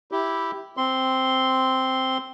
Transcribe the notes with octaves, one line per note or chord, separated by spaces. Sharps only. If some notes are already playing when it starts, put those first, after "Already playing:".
E4 G4
C4 C6